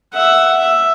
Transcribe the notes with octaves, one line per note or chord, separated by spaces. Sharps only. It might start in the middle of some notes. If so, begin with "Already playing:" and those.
E5 F#5
E5